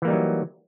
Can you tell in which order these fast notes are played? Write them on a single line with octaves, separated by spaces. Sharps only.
E3 A#3 G3 D#4 F#3